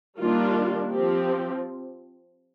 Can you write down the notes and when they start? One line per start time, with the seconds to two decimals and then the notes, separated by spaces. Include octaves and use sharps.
0.20 D#3 G3 A#3 D4 F4
0.93 F3 C4 G4